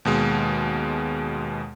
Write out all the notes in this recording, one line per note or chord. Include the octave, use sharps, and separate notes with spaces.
D#2 B2 G#3